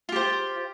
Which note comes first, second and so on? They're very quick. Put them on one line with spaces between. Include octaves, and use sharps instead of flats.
F4 G4 C5